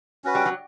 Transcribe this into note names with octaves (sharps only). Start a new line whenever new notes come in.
C#4 F#4 B4
G3
F#3